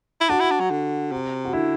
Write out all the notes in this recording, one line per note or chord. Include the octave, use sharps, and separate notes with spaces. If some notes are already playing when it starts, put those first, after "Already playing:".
E4
D4 F#4
E4
D4
F#3
D3
C3
F#4
D3 E4